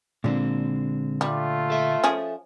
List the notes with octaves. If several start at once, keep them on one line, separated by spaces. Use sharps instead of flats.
A#2 D3 G#3 C4
G3 A3 F4
A4 E5
F3 C#4 G#4